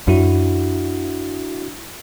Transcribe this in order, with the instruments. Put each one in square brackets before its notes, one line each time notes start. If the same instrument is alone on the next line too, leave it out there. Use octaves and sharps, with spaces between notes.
[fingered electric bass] F#2 [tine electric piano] D4 E4 F#4